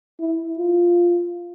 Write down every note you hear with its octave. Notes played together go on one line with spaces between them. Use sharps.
E4
F4